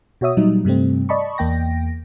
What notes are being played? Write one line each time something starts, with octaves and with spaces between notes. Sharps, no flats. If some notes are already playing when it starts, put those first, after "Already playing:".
B2 F#4 C#5 E5 D#6
A#2 F#3 G3 D#4
G2 C3 G3 A3 C4
D5 D#5 A5 B5 C#6
E2 A#3 G5 A#6